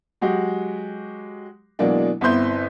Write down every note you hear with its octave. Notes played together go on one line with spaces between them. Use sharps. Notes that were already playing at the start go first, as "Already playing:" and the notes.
F#3 G#3 F#4 G4
B2 E3 F#3 G#3 A#3 D4
G1 B3 C4 E4 C6 G6